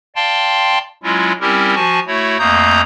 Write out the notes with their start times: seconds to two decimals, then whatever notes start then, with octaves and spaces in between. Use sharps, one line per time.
0.16 D5 F5 G5 A5 C6
1.03 F#3 G#3 C#4 E4 F4
1.41 G3 C4 C#4 E4 G4 A#4
1.75 F3 F#4 G#5 A5 C#6
2.07 A3 E4 F#4 C#5
2.39 F2 A3 A#3 A#5 D#6 G6